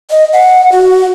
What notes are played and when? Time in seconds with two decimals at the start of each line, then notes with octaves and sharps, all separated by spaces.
0.10 D#5
0.33 F#5
0.72 F#4